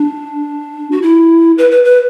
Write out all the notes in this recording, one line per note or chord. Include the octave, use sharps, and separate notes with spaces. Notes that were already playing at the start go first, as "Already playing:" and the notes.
Already playing: D4
F#4
E4
B4
B4
B4